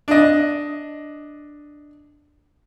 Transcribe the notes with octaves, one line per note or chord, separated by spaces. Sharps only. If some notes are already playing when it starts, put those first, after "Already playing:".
D4 D#5